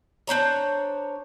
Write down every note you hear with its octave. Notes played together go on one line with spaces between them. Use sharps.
D4 C5 C#5 A#5